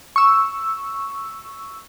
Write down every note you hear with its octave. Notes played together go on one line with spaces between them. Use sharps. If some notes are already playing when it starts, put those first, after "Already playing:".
C#6 E6